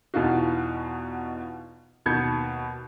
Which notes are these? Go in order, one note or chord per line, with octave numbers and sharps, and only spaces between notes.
E2 B2 D#4 F4 F#4
D#2 B2 B5 G6 G#6 C#7